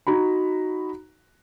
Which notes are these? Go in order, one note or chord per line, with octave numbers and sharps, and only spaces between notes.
D#4 F#4 A#5 B5